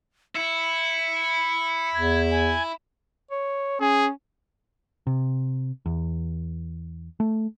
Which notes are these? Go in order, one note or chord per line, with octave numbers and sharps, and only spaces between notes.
E4 C#7
E2 G#6
G#5
C#5
C#4 G#4
C3
E2
A3